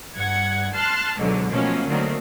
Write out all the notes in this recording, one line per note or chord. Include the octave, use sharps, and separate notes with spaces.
G2 F#5 G#6 C#7
A5 C6 F6 F#6
C#2 G#2 B2 D3 F#3
B2 F3 F#3 A3 A#3 C#4
D3 D#3 F#3 A3 A#3 C4